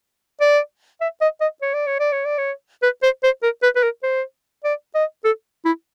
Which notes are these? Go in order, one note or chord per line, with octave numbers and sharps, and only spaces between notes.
D5
E5
D#5
D#5
C#5
D5
C#5
D5
C#5
D5
C#5
B4
C5
C5
A#4
B4
B4
A#4
C5
D5
D#5
A4
E4